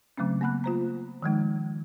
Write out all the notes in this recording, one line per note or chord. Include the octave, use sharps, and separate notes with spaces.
C#3 F#3 A3 C4 C#4
A#3 B3 F#5 B5 F#6
F4 C5 A#5
D#3 F3 G#3 D#4